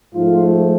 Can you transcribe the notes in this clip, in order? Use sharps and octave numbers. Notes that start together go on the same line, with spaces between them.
G#2 F3 A3 F4